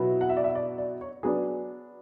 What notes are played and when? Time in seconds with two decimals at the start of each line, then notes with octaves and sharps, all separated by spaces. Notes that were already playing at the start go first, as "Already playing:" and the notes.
Already playing: B2 F#3 B3 E4
0.21 F#5
0.29 E5
0.37 D5
0.44 E5
0.55 D5
0.78 D5
1.01 C#5
1.23 F#3 B3 D4 G#4